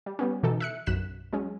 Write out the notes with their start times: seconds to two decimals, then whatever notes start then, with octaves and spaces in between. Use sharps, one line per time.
0.06 G3
0.19 G3 B3 C#4
0.43 B2 E3 D#4 A4
0.60 E5 F#6 C#7
0.86 B1 F#2 F#6 B6 E7
1.33 F#3 G#3 C#4